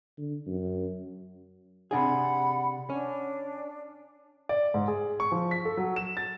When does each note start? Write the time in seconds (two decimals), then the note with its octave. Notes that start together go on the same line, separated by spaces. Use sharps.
0.18 D3
0.47 F#2
1.91 C3 D4 G#4 F#5 B5
2.90 C#4 D4
4.49 D5
4.74 G#2
4.88 G#4
5.20 C#6
5.32 F3
5.51 B6
5.65 A4
5.77 F#3
5.96 E7
6.17 A6